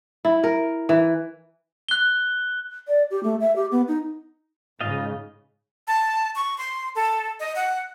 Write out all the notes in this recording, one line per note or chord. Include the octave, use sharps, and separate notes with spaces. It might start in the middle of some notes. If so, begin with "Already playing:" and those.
E4
A#4
E3
F#6 G7
D5
G4
A3
E5
G4
B3
D#4
G#2 C#3 F4 D#5 F5
A5
C#6
C6
A4
D#5
F#5